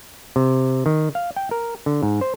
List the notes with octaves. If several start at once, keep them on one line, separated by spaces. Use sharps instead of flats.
C3
D#3
F5
G5
A#4
D3
G#2
C5